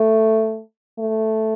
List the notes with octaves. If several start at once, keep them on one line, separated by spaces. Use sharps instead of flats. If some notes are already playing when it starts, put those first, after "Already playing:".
Already playing: A3
A3